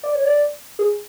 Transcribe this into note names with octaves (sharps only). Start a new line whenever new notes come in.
D5
C#5
D5
G#4